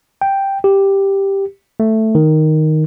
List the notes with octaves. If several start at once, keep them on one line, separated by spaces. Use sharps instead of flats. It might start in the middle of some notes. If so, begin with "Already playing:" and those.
G5
G4
A3
D#3